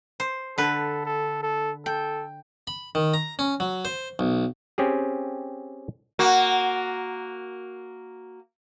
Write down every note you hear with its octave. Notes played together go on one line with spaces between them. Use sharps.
C5
D3 A4 B4
A4
A4
A4 G5
B5
D#3
A#5
C#4
F#3
C5
B1
C4 C#4 G4 G#4
A#3 F#4